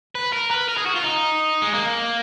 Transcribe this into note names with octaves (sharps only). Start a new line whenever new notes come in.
B4
A#4
B4
A#4
G#4
F#4
F4
D#4
G#3
A#3